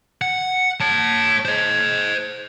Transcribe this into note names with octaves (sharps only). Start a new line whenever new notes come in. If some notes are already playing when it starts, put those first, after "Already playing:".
F#5
C#5 A5
C5 D#5